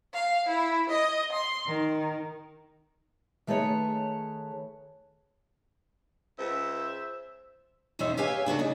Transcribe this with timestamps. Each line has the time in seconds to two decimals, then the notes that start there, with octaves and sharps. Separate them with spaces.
0.13 F5
0.48 E4
0.89 D#5
1.32 C6
1.68 D#3
3.47 D#3 A3 G#4 B4 C#5
6.39 C#2 C5 E5
7.99 E2 B2 D#3 C#4 C5 E5
8.17 G4 B4 C#5 E5 F5 G#5
8.46 C#3 D4 F#4 A4
8.59 C#3 D#4